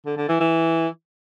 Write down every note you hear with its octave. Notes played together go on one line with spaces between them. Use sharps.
D3
D3
E3
E3